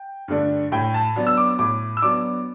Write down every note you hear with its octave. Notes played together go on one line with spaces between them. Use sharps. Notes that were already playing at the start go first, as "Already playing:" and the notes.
Already playing: G5
G2 D3 A3 D4
A2 G5
A5
F#3 B3 D4
E6
D6
A2 D6
E6
F#3 B3 D4 D6